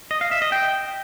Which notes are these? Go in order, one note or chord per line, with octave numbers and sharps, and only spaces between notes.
D#5
F5
E5
D#5
G5